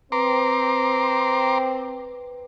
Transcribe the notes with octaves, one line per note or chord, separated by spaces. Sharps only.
C4 B4 A#5 C6 D6